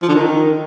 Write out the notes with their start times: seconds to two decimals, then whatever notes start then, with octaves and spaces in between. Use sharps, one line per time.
0.02 F3
0.08 D3
0.15 D#3